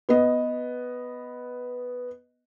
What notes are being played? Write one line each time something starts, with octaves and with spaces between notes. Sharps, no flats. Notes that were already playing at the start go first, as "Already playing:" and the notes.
B3 D#5